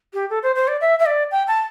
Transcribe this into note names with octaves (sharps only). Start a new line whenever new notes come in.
G4
A4
C5
C5
D5
E5
E5
D5
G5
A5